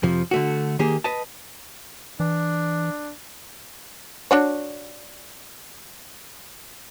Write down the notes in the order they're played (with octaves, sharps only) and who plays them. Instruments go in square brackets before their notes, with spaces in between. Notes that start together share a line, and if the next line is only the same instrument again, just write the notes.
[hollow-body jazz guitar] F2 C3 F3
D3 A3 F#4
D#3 A#3 G4 G#4
B4 D#5 A5
[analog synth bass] E3 [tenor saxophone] D4
[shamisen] D4 F#4 C#5